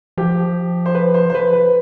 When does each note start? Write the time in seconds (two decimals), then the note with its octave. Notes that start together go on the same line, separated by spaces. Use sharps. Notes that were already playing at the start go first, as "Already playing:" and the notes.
0.17 F3 G4
0.86 C5
0.95 B4
1.14 C5
1.30 C5
1.34 B4
1.53 B4